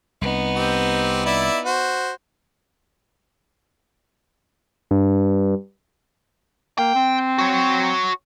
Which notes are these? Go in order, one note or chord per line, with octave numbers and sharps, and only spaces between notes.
C2 B3 D#4
C4 G4
E4 D5 E5
F#4 C5
G2
A#3 G5
C4
F#4 C#5